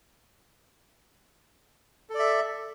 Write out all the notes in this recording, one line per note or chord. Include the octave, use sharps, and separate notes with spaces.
A4 D5 E5